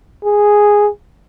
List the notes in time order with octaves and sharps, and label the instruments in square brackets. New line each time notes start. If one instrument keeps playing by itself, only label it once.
[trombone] G#4